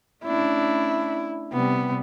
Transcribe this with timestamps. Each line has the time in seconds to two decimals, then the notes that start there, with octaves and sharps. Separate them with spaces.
0.24 A3 C#4 D4 E4
1.53 C3 G3 B3